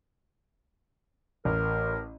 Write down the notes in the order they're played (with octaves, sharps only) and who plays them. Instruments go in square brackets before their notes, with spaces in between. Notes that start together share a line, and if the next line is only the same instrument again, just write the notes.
[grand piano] A1 [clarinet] A#4